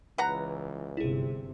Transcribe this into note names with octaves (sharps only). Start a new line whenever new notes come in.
C#2 E3 B4 F#5 A#5
G1 C3 E4 G#4